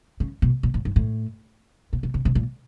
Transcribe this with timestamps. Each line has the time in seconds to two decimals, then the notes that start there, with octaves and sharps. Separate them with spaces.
0.20 C#3
0.42 B2
0.63 A#2
0.74 A2
0.85 G#2
0.96 A2
1.93 A#2
2.03 B2
2.14 C3
2.25 C3
2.35 A#2